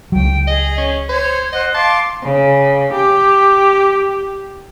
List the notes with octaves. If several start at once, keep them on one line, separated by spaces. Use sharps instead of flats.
C#2 F#3 G5
G#4 D#5
C#4
C5 C#5 G#6
C5 D#5 F#5
F5 A5 C6 D6
C#3
G4